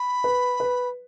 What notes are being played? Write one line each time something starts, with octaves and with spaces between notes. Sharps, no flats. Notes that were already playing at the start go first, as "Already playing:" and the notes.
Already playing: B5
B4
B4